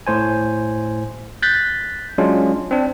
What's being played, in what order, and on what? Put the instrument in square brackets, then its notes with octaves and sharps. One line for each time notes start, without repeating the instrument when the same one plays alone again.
[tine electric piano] A2 C5 G#5
F#6 G6 A6 B6
F#3 G#3 C#4 D4 F4
C4 D4